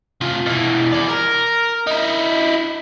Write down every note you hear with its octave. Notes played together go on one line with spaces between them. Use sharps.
C3 F4
B2 E3
G#4 D5
A#4
D#4 E4